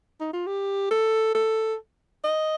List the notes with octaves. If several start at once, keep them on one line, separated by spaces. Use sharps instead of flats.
D#4
F4
G4
A4
A4
D#5